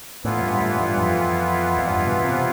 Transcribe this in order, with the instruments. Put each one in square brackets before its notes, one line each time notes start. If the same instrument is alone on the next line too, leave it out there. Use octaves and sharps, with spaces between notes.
[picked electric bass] A2 [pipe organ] E3 B3 F4
[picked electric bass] G2
A2
G2
F2
F2
G2
B2
C3